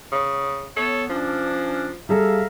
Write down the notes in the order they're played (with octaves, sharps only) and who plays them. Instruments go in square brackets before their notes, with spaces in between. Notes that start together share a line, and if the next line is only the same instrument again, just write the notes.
[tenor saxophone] C#3
[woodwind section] B3 C#5 [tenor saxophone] A4
[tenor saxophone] F3 [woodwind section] C#4 D4
[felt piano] G3 G#4 A4 [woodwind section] E5 F5 A#5